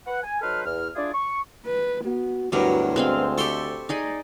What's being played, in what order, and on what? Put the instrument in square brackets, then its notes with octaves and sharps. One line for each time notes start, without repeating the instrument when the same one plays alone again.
[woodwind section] B4 F#5
G#5
F#3 D#4 A4 B4 C5 F6
E2 F6
D4 E4 F4 G#4 D5
C#6
[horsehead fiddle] B4
[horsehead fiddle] B3 [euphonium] F#4
[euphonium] D2 [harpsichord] G2 B2 [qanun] F#3 G3 A#4 [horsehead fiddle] E4 F#4
[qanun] G#3 C4 F5 [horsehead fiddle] C5
[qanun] G4 A4 [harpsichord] E5 C6 C#6
[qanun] D#4 G#4 D#5 [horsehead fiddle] D5